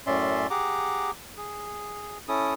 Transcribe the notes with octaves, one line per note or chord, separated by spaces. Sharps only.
F#2 A2 C#4 D5 E5 C6
G4 G#4 F#5 A#5 D6
G#4
C#4 E4 A4 D#6